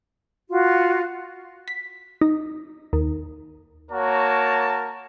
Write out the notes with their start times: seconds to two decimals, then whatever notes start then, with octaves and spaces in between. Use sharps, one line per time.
0.50 F4 F#4
1.68 B6
2.21 D#4
2.93 D#2
3.91 A#3 F#4 A#4 C#5 A5